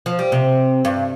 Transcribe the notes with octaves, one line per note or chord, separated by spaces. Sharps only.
F3
G3
C3
G2